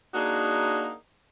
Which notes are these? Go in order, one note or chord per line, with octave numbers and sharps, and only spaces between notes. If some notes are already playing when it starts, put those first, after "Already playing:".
A#3 D4 D#4 F#4 G#4